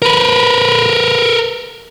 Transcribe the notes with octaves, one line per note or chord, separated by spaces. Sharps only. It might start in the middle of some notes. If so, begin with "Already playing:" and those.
A#4 B4